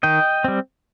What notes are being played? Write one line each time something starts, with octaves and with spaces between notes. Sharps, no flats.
D#3 D#5 G5
G3 C4